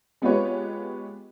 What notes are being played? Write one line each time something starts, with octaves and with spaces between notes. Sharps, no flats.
G#3 B3 F4 G4 B4 C#5